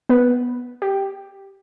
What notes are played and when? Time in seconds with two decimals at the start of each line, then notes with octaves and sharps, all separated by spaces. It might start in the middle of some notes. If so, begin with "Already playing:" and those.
0.09 B3 B4
0.82 G4